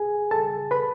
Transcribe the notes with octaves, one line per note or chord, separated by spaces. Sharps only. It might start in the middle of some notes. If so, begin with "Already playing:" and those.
Already playing: G#4 G#5
A4 A5
B4 B5